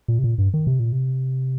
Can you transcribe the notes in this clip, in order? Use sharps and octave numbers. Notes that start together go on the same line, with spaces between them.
A#2
C3
A#2
G2
D#3
C3
A#2
C3